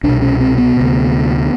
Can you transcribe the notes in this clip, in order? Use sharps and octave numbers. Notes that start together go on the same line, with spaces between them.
C2 B2 D4
C#4
C4
B3
D2 C3